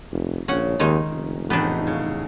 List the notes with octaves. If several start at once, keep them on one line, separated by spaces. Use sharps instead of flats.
F1
A#1 C#3 C#4 F#5
D#2 D#3 G#3 D#4
F1
E2 A2 B3 D4 D#4
C#3